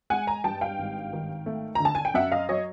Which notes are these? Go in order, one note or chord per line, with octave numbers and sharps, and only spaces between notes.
G#3 F#5 G#5
G#5 A#5
G2 G5 A5
F5 G5
G#1
D#3
A3
D3 A#5
A5
G#5
G5
F#2 E5 F#5
D#5 F5
F#3 C#5 D#5